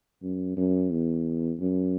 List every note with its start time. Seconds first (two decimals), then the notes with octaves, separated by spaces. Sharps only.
0.23 F#2
0.57 F#2
0.92 E2
1.60 F#2